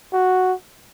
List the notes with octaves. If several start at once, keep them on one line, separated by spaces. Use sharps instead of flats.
F#4